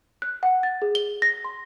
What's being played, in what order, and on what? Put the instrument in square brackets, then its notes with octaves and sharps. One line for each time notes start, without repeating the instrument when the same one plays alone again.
[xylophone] F#6
F#5
A6
G#4
G7
A#6
C6